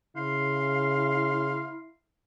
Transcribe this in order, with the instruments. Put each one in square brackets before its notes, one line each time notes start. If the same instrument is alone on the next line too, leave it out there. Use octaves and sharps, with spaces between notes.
[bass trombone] C#3 [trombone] E4 [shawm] F5 [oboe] C6